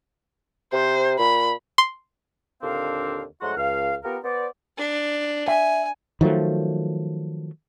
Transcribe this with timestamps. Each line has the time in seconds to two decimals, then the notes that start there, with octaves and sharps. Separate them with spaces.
0.73 C3 C5
1.19 A#2 B5
1.78 C6
2.62 D#2 A#2 D3 C4 D4 F5
3.42 G#2 F#3 A3 F#4 F#5 C6
3.57 C#2 F5
4.04 B3 F4 G4 A#4
4.24 B3 C5 D5
4.78 D4
5.48 E5 G#5
6.21 D#3 F3 F#3 A3